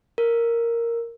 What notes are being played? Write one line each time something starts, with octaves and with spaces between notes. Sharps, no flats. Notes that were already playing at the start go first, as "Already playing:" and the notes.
A#4